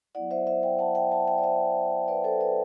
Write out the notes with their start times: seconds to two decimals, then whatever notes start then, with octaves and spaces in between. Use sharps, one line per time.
0.15 F#3 B3 E4 D5 F#5
0.31 C5 E5
0.47 C5 E5
0.63 E5 G5
0.79 F#5 A5
0.95 E5 G5
1.12 F#5 A5
1.28 E5 G5
1.38 D5
1.44 C5 E5
2.08 B4 D5
2.24 A4 C5
2.40 B4 D5